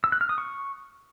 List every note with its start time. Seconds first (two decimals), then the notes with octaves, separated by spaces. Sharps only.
0.04 E6
0.12 F#6
0.21 F6
0.29 D#6
0.38 C#6